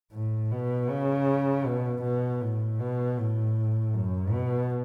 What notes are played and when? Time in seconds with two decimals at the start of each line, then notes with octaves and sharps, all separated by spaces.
0.13 A2
0.51 B2
0.89 C#3
1.66 B2
2.03 B2
2.41 A2
2.80 B2
3.18 A2
3.93 F#2
4.32 B2